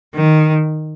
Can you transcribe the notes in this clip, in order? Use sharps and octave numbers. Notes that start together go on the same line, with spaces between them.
D#3